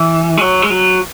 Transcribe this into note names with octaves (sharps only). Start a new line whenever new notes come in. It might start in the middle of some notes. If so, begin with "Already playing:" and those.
Already playing: E3
G#3
F#3
G#3
F#3